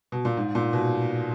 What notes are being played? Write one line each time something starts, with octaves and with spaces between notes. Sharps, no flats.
B2
A#2
G#2
A#2
B2